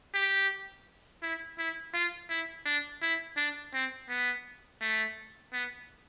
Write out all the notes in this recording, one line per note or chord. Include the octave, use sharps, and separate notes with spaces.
G4
E4
E4
F4
E4
D4
E4
D4
C4
B3
A3
B3